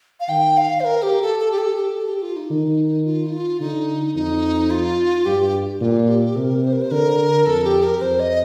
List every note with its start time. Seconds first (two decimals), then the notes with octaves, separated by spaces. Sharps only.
0.20 F5
0.29 D#3 G5
0.57 F5
0.80 C5
0.85 A#4
1.03 G4
1.22 A4
1.39 A4
1.52 G4
1.58 A4
1.76 G4
1.95 A4
2.09 G4
2.22 F4
2.36 D#4
2.50 D#3
3.05 F4
3.27 D#4
3.32 F4
3.60 D3 D#4
4.15 F2 D#4
4.71 F4
5.25 G2 G4
5.81 A#2 F4
6.09 G4
6.36 C3 A#4
6.64 C5
6.73 A#4
6.82 C5
6.91 D3 A#4
7.46 F2 A4
7.64 G4
7.83 A#4
8.01 F2 C5
8.20 D#5